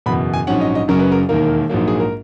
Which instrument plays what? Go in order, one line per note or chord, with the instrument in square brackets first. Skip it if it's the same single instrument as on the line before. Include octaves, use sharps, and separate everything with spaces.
[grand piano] F#1 E2 B2 B5
G#5
A#1 G#2 F#3 C#4 F#5
D#5
D#5
F#1 F#2 C#3 F#3 C#4 A#4
B4
A#4
E1 D#2 D#3 A#3 A#4
A#1 G#2 F#3 A#3
G#4
A#4